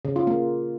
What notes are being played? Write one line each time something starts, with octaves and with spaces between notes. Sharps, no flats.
C#3
F4
A#3